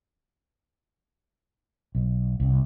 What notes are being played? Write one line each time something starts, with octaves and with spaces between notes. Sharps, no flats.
B1
C2